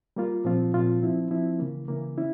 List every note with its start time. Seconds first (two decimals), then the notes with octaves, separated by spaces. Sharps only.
0.16 G3 A#3 F4
0.45 A#2 F3 C4 F4
0.74 A#2 F3 C4 F4
1.02 F3 C4 E4
1.31 F3 C4 E4
1.59 C#3 E3 A#3
1.88 C#3 E3 A#3
2.18 C#4 E4